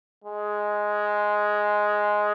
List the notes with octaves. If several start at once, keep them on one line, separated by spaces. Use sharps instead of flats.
G#3